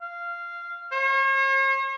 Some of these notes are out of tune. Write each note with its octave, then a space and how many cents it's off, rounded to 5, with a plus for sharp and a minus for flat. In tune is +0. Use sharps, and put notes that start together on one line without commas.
F5 -15
C#5 -45